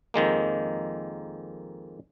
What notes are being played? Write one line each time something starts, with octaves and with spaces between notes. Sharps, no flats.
F2 D#3 G#3 A#3